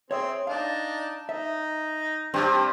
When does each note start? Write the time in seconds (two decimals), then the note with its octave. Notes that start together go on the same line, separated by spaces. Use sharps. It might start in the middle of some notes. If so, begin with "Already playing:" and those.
0.11 C4 G#4 C5 C#5 E5
0.47 D4 D#4 F5
1.29 D#4 E5
2.34 G2 C4 G4 F6